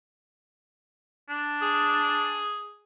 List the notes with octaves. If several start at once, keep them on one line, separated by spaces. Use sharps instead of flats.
D4
G#4